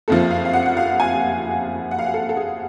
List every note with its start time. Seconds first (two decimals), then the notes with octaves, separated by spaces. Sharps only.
0.08 F#1 F2 F3 A4
0.31 F5
0.45 F5
0.53 F#5
0.66 F#5
0.77 F5
1.00 G#5
1.91 F#5
1.99 F5
2.06 F#5
2.14 A4
2.29 A4
2.37 G#4